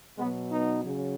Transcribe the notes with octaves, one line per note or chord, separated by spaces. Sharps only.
B2 G#3 B3
F#3
B3 D#4
C#3 F#3